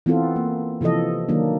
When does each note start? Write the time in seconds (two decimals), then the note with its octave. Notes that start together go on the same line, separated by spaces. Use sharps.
0.06 E3 B3 C4 F4 A4
0.36 A#3
0.81 C3 E3 F3 A4 D#5
1.29 D#3 F#3 A#3 D4